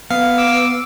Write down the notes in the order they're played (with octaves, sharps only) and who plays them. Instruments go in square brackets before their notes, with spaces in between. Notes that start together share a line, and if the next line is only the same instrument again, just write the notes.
[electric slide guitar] B3 [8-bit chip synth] F5
[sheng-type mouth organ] D6 E6